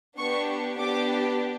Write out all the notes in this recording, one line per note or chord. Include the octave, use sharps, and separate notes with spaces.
B3 D4 G4 C#6
B3 D4 G4 D6